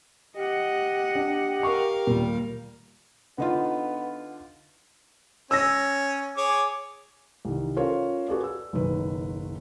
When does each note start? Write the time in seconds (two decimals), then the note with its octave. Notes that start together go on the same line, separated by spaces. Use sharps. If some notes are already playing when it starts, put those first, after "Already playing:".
0.37 G4 D#5 F#5
1.15 D4
1.63 A#4 F5 C#6
2.07 D#1 A#2 G3
3.38 D3 B3 D#4 F4
5.51 C#4 E6 A#6
6.37 G#4 C#5 D6
7.45 C2 D#3
7.76 C#4 F4 A4 A#4 C5 C#5
8.28 F#4 G#4 A4 B4 D5
8.44 E6
8.73 F#1 B1 D#3 B4